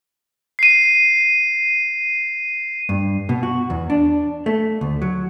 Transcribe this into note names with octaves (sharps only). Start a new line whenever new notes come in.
C7 D#7
G2
B2
F#4
E2
D4
A3
D2
F#3